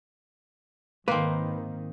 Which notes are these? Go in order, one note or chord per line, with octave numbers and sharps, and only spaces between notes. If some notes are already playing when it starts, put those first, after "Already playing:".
G#2 D#3 A#3 C4 B4